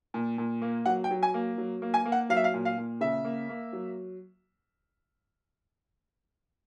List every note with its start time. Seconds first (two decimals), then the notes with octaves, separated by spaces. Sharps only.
0.14 A#2
0.38 A#2
0.62 A#3
0.86 F#3 F#5
1.04 G5
1.11 F#3
1.23 G#5
1.34 A#3
1.58 F#3
1.82 A#3
1.94 G#5
2.05 A#3
2.12 F#5
2.30 F#3 F5
2.37 E5
2.44 F5
2.54 A#2
2.65 F5
2.78 A#2
3.01 C#3 E5
3.25 A#3
3.49 A#3
3.73 F#3